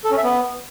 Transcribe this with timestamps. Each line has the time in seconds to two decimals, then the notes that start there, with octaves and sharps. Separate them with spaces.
0.04 A4
0.11 C#4
0.17 E5
0.24 B3